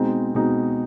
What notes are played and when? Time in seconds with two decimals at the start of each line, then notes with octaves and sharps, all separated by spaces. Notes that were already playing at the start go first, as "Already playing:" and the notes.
Already playing: B2 G#3 C4 D#4
0.35 B2 G#3 C4 D#4